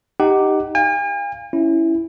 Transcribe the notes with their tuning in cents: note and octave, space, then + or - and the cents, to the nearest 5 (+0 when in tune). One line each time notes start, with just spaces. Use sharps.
D#4 +0 G4 +0 F#5 +25
F5 +0 G#5 -45
C#4 +0 E4 +0